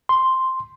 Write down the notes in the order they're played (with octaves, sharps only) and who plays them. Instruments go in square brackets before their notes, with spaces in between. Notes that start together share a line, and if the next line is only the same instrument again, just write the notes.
[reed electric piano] C6